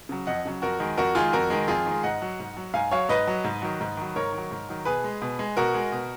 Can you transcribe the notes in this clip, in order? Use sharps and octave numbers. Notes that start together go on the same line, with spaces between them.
C#3 F#3
F2 D#5 F#5
C#3 F#3
F2 F#4 A#4
D#3 G#3
F2 F#4 A#4
D#3 G#3 F4 G#4
F2 F#4 A#4
D#3 G#3
F2 F4 G#4
D#3 G#3
G#2 D#5 F#5
F#3
G#2
F#3
G#2 F5 G#5
F#3 C#5 F5
G#2 B4 D#5
F#3
G#2
D#3 F#3
G#2
D#3 F#3
G#2 A#4 C#5
D#3
F#3
G#2
D#3 F#3
B2 G#4 B4
G#3
B2
G#3
B2 F#4 A#4
G#3
B2